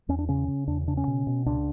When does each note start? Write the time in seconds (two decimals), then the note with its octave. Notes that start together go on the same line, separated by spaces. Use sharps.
0.09 E2 C#4
0.19 D4
0.29 C#3 C#4
0.48 C#3
0.68 E2 D4
0.87 C#3 D4
0.97 C#4
1.07 B2
1.27 B2
1.46 C#2 D4